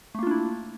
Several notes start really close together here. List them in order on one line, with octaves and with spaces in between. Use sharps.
A3 A#3 F4 D4 E4